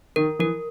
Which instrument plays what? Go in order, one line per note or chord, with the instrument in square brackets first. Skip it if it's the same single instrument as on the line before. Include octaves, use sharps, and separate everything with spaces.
[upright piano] D#3 [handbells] A#4
[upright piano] E3 [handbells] A#4